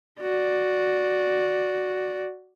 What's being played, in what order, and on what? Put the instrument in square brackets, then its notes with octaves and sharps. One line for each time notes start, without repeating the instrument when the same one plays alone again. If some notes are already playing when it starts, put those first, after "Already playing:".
[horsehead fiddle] F#4 D5